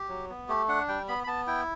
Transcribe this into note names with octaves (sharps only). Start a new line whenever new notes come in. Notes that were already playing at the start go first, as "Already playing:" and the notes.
Already playing: G4
F#3
B3
A3 G4
D4 F#5
G3 G5
B3 B5
B5
B3 A5
E4 G5